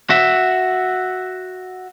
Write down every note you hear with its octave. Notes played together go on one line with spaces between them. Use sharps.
F#4 E5